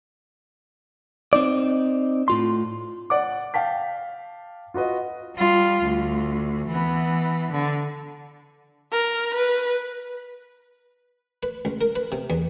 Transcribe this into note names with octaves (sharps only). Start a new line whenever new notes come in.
C4 D#4 D5
A2 F4 C6
D5 F#5 D6
F5 G5 A5 B6
F4 F#4 B4 D#5
G3 F4
D2
E3 B3
D3
A#4
B4
B4
C#2
A#4
B4
C3
E2